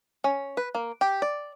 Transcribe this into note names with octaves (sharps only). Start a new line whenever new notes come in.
C#4
B4
A#3
G4
D5